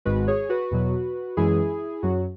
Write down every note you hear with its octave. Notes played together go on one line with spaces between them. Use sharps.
G#1 G#2 G#3 F#4 B4
G#4 C#5
F#4 B4
E2 B2 F#3
F#2 E3 G#3 E4 G#4
F#2 F#3 F#4